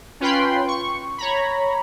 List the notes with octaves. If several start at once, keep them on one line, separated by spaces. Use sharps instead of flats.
C#4 F4 B4 G5 B5 C6
C#6
C#5 A#5 B5